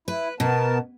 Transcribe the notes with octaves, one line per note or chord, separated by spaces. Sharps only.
E4 B4
B2 B3 A#4 A5